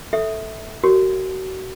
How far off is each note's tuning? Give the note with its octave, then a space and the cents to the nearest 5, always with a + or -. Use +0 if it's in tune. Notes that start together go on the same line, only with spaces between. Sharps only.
A4 +0 E5 -15
F#4 +35 A#4 -35 C#5 +0